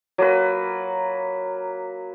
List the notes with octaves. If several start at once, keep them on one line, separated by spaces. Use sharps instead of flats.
F#3 A#3 B4